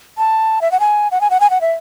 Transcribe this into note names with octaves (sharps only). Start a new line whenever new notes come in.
A5
E5
F#5
G#5
F#5
G#5
F#5
G#5
F#5
E5